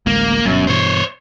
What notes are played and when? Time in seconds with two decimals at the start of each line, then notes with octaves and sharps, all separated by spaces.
0.07 A1 D2 G#3 A#3
0.45 G1 F#2 B2
0.67 G2 B2 E3 C5 C#5